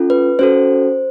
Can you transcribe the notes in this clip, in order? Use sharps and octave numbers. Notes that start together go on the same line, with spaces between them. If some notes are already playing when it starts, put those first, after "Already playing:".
Already playing: C#4 F4 A4
B4
C#4 F#4 A4 C5